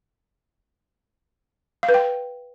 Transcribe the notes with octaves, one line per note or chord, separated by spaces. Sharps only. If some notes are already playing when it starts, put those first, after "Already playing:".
F5
B4
G5